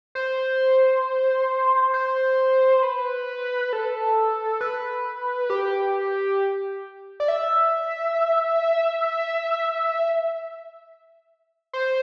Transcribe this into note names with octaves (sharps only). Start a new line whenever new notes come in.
C5
C5
B4
A4
B4
G4
D5
E5
C5